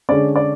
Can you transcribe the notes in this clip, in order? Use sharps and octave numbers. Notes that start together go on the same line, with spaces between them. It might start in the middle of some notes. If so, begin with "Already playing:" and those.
D3 G#3 C#4 D5
D5